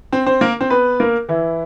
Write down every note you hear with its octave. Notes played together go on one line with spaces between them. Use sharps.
C4 C5
C4 C5
A#3 A#4
C4 C5
B3 B4
A#3 A#4
E3 E4